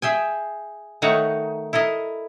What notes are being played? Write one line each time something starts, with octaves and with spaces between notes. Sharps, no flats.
G#4 E5 G5 G#5
D#3 A3 D#4 F#4 C#5
E4 A4 A#4 D#5